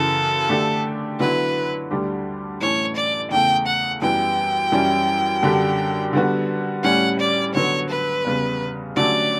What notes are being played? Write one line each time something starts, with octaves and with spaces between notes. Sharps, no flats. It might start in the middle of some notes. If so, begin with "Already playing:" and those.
Already playing: F#2 C#3 E3 A4
D3 A3 D4 G4
D3 F#3 B3 E4 B4
D2 D3 G3 D4 G4
A2 E3 A3 C#4 C#5
D5
E2 C#3 E3 A3 G5
F#5
F#2 E3 G3 B3 G5
F#2 E3 G3 C#4 E4
F#2 D3 G3 D4 G4
D3 G3 B3 F#4
A2 G3 C#4 F#5
D5
D3 F#3 B3 C#5
B4
E2 C#3 G3 B3
D3 F#3 A3 C#4 G4 D5